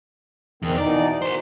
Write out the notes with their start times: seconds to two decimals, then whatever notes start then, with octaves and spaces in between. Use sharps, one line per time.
0.63 E2 D#3 C4
0.78 B2 E3 D#4 D5
1.22 B2 A#4 C5